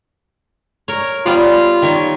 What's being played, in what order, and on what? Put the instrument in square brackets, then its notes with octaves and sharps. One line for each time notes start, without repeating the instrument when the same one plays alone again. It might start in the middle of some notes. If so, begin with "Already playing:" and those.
[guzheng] A#4 C#5
[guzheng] G3 B3 D5 [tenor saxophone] F4
[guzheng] D#3 C#5